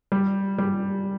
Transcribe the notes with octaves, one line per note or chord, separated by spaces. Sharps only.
G3
G3